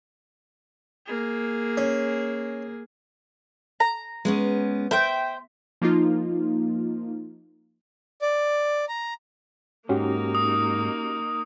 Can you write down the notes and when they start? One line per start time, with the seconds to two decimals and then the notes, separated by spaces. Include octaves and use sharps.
1.06 A#3 G#4
1.77 C#4
3.80 A#5
4.25 G#3 B3 C#4
4.91 C5 E5 G5
5.82 F3 A#3 D#4 F4
8.22 D5
8.89 A#5
9.89 G#2 A#3 C#4 D#4 F#4 G4
10.35 D#6